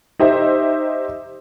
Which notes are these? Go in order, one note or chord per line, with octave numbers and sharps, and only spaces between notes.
D#4 G4 C5 E5